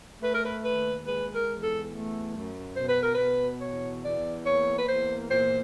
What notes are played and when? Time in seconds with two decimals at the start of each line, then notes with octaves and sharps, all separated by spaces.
0.22 A3 B4
0.34 A#4
0.45 B4
0.64 D#2 B4
1.07 G#3 B4
1.35 A#4
1.49 E2
1.64 A4
1.92 A3
2.34 F#2
2.76 B2 C5
2.89 B4
3.02 A#4
3.15 B2 B4
3.61 E2 C#5
4.04 E2 D5
4.46 A#3 C#5
4.78 B4
4.88 E2 C5
5.31 A#2 C5